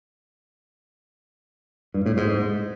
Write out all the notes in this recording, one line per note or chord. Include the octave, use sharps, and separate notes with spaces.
G2
A2
G#2